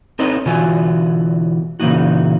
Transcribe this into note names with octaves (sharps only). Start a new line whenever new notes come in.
C4 D#4 A4 B4 C#5 D#5
B2 D3 E3 F4 F#4 G#5
A#2 C#3 E3 A#3 D#4 F#4